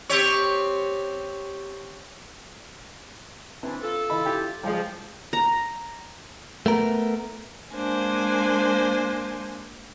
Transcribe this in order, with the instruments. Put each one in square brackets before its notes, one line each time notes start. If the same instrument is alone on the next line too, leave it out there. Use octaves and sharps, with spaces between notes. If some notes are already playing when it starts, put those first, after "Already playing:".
[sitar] C4 G4 C#5
[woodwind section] E3 D4 [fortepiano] C4
[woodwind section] F4 A4
[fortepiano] E3 D#5 B5
E4 G4 G5
[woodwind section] F3 [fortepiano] G3 G#3
[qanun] A#5
[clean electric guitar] A3 B3 A#4
[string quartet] G#3 A#3 D4 C5 G#5